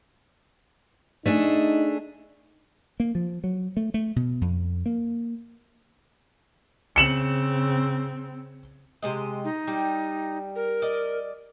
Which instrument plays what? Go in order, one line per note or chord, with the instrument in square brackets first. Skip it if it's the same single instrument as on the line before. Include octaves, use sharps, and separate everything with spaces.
[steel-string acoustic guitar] A3 D4 G#4 [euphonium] D#4
[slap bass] A#3
F3
F#3
A3
A3
B2
F2
A#3
[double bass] C#3 C4 [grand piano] C#7 E7 F#7
[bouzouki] C3 G#3 D#5
[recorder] D#4
[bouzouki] G3
[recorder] A#4
[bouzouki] D5 D#5